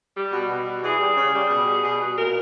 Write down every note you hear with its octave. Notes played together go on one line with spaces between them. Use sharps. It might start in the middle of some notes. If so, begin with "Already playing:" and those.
G3
B2
B2
G3
E3 G#4
G3
C#3
G3
B2
G3
B2
B2
A#2 A#4